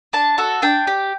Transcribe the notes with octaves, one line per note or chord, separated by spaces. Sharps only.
D4 A5
F#4 A4
D4 G5
G4